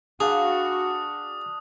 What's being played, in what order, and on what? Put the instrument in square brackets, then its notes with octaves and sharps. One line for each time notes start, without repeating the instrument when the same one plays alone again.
[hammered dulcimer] D4 F5 B5 [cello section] F#4 [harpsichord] G#4 [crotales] D#6